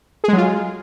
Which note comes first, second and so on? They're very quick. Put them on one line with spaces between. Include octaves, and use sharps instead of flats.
G#4 G#3 F#3 F4